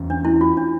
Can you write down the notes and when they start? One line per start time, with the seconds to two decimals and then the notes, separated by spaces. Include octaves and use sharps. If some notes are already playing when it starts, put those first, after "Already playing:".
Already playing: E2 E3 C#4
0.10 D4
0.25 E4
0.41 F4
0.57 D4